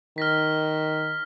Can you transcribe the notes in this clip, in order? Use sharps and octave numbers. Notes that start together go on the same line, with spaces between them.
D#3 F6 A#6 B6